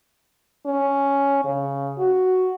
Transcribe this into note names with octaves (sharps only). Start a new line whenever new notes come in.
C#4
C#3
F#4